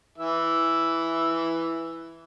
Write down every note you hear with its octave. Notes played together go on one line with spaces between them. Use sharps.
E3 E5